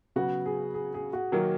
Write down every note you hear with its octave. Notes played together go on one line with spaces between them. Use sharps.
C#3 F#3 B3 F#4
G#4
G#4
G#4
F#4
D#3 F#3 A#3